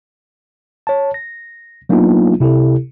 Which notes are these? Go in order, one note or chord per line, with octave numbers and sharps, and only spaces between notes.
C#5 A5
A#6
F#3 A#3 B3 D4 D#4 F4
C3 E4 G4 A4